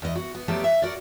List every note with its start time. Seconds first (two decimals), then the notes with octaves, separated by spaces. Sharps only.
0.02 E2 D#5
0.15 F#4
0.35 B3
0.48 F3 F#3 A3 B3 G4 D5
0.64 E5
0.82 F#4 A#4 D5